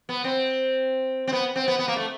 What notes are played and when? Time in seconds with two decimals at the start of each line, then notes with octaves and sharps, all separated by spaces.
0.09 B3
0.24 C4
1.27 C4
1.32 B3
1.56 C4
1.68 B3
1.79 B3
1.88 A#3
1.96 A3